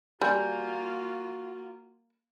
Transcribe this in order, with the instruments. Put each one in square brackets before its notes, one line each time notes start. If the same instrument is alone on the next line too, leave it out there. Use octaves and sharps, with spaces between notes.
[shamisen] G3 [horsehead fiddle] A#3 F4 [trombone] F#4 [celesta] G#5 C6 G6